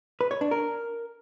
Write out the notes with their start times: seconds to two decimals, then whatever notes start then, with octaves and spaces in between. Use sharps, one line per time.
0.21 B4
0.31 C#5
0.41 D4
0.51 A#4